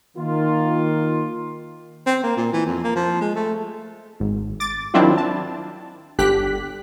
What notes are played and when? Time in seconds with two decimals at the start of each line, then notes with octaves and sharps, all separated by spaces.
0.17 D#3 A#3 F4
2.06 C4
2.23 A#3
2.37 A#2
2.53 E3
2.66 F2
2.84 A#3
2.96 F3
3.21 G#3
3.36 A3
4.20 G#1
4.60 D6 A6
4.94 D#3 F#3 C4 D4 E4 F4
5.17 A5
6.18 G1 D3 G4 F#6 B6